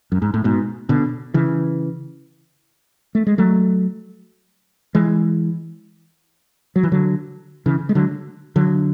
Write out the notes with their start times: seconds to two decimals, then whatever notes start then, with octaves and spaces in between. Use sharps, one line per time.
0.12 F#2
0.22 G#2
0.34 A2
0.44 G#2 B2
0.89 B2 D3
1.34 C#3 E3
3.15 A3
3.27 G#3
3.38 F#3 A3
4.95 E3 G#3
6.76 F#3
6.83 E3
6.92 D3 F#3
7.66 C#3 E3
7.89 G#3
7.95 D3 F#3
8.56 D3 F#3